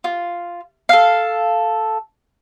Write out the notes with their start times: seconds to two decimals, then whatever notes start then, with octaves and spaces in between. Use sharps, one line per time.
0.04 F4
0.89 A4 F5